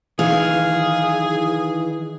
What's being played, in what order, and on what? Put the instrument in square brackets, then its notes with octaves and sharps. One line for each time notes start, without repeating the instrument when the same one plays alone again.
[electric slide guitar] D#3 E3 [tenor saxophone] G#4 [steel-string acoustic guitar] F5